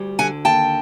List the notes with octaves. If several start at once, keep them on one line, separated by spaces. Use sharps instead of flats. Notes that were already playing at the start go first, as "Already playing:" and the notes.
Already playing: D2 G3
D3 F#5 G#5
D#2 G5 A5